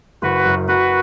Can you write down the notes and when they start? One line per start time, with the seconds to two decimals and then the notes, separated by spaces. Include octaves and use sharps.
0.22 F#1 F#4 B4
0.46 F#2
0.68 F#3 F#4 B4